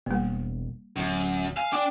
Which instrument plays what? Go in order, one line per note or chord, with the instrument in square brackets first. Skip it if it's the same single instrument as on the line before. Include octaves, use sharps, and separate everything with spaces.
[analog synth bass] E1 [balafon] G3 A#3
[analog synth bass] D1 [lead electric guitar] F#2
[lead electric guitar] F5 [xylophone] G#5
[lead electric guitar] D4 [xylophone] G5 D6